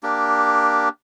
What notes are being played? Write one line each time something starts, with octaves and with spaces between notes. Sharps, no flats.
A#3 D4 G4